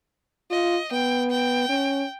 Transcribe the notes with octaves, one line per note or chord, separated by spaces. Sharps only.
F4 D#5
B3 G5
G5
C#4